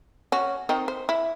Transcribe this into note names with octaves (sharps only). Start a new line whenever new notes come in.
C#4 F#4
D#3 C4 D#4
C5
E4